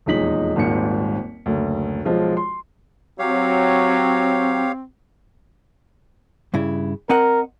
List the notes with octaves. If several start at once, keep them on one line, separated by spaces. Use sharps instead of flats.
D#1 E2 G#3 D#4 B6 F#7
D#1 G#1 D#2 G#2 A#3 C#7
F#1 D2
B1 F3 G#3 F4
C6
F#3 C4 G4 C#5 F5
G2 C#3 E4
C4 A#4 D#5 F#5